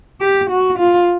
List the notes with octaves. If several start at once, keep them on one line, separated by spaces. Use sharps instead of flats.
G4
F#4
F4